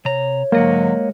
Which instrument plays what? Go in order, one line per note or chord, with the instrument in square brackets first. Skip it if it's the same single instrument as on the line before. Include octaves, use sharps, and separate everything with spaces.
[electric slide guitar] C3 A#5 [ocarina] C#5
[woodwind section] G#2 D3 F#3 [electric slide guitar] G#3 D#5 F#5 [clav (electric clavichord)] A#3